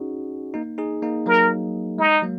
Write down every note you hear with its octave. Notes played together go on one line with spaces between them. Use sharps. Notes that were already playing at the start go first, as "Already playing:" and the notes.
Already playing: C#4 D#4 F#4 G#4
A#3 D#4
D#4 G#4
A#3 D#4
F#3 A#3 A#4
G#3 D#4
F#3 A#3